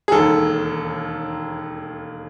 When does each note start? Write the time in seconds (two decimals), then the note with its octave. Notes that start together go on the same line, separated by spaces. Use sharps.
0.08 G#4
0.12 E1 D#2 D#3 A4